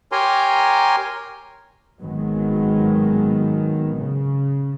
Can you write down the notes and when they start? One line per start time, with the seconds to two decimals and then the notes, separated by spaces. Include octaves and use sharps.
0.12 G4 A#4 C#5 G#5 A#5 C6
2.01 G#1 D#3 F#3 G#3 B3
3.97 C#3